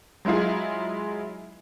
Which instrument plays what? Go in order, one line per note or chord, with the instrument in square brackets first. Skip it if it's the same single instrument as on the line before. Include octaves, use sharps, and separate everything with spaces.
[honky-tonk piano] F#3 G#3 E4 F4 G#4